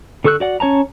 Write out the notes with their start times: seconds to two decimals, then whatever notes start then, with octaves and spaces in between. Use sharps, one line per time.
0.24 D3 A4 C#6 E6 F#6
0.40 F#4 D5 F#5
0.60 C#4 C#5 A5 A#5